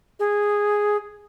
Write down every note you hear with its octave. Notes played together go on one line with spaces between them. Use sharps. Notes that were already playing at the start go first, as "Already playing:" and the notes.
G#4